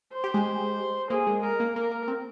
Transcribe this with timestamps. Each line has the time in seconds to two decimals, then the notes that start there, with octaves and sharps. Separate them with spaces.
0.14 C5
0.24 G4
0.34 G#3
1.10 A#3 G#4
1.27 G#3
1.43 G#3 A#4
1.60 A#3
1.76 A#3 A#4
1.92 A#3
2.08 C4